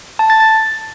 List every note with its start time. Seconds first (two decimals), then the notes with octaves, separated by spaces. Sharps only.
0.19 A5
0.30 A6
0.40 A6